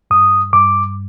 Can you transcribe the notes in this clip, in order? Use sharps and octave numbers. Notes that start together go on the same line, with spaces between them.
G2 D#6
G2 D6